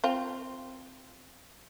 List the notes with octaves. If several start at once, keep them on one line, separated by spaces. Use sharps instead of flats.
C4 F4